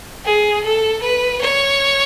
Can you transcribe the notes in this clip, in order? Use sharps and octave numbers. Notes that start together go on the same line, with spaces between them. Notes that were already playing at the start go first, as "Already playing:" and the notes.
G#4
A4
B4
C#5